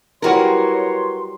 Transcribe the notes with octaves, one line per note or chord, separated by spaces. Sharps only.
F#3 G3 E4 F#4 A#4 B4 C#5 C6